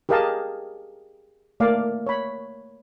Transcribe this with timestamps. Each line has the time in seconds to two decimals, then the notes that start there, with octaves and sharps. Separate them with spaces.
0.09 G4 G#4 A#4 D#5 F5 A5
1.60 A3 A#3 D5 F5
2.06 C#5 B5